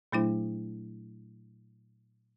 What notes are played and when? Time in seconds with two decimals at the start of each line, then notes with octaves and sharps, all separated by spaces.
0.12 A#2 F#3 A3 D4 E4 C5